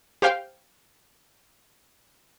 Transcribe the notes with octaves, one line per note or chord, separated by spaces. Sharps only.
G4 C5 F5 G5